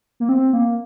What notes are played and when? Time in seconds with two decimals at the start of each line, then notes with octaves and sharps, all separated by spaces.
0.20 A#3
0.29 C4
0.53 A#3